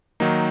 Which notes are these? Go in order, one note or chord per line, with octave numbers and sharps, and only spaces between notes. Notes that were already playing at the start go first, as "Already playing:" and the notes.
D#3 F#3 A#3 D#4